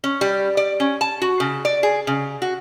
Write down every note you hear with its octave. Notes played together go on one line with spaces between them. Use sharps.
C#4
G3
D5
C#4
A5
F#4
C#3
D5
G#4
C#3
F#4